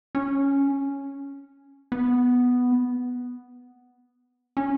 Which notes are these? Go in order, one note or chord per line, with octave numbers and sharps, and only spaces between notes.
C#4
B3
C#4